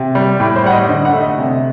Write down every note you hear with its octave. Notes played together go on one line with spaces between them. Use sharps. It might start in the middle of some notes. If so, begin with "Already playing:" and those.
Already playing: C3
G3
A2 G4
C5
G3 F#5
D#5
D3 D#5
F#5
A3
D#5
C3